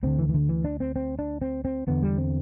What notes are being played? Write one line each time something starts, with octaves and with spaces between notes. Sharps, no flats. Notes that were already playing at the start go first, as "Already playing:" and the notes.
D2 D3 C4
E3
E3
D3
E3
D4
C4
C4
D4
C4
C4
E2 D3 B3
G3
C4